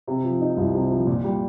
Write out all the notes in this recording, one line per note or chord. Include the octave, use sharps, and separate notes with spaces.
C3
F3
D#4
C2
C3
F3
A#2
G3